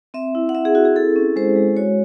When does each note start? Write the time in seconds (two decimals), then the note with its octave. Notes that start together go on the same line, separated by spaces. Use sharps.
0.14 C4 E5
0.35 E4
0.49 F#5
0.55 C4 E5
0.65 G#4
0.75 E4 F#4
0.85 G#4
0.96 E4 A4
1.16 C#4
1.36 G#3 C5
1.56 G#3
1.77 F#4 C#5